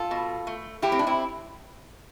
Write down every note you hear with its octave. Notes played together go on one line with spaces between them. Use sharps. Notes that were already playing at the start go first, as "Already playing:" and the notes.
Already playing: F4 A4
B2
A3
A2 E4 G4
C4
D4
C4 E4